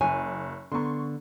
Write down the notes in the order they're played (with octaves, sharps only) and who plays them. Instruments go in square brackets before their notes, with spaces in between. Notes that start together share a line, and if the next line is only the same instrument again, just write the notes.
[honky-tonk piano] F#1 [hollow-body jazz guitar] C#5 [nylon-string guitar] G#5
[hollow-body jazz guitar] D3 B3 A#5 [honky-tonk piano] C6 C#6